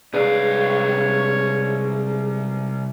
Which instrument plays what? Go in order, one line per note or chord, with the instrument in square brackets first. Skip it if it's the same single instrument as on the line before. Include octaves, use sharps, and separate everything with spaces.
[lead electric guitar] C2 F5 [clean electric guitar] G#2 B4 D5 [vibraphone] G#4 [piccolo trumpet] C#5